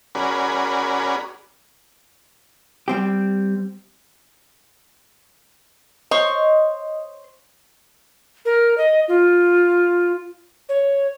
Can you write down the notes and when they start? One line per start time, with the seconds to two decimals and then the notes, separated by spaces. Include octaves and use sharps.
0.15 C#4 F#4 G#4 A#4 D5 B5
2.88 G3 C4 G4
6.11 C5 C#5 D#5 C#6
8.45 A#4
8.78 D#5
9.08 F4
10.69 C#5